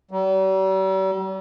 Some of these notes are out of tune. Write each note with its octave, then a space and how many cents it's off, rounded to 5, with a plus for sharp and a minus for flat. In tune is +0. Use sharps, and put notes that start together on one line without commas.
G3 -45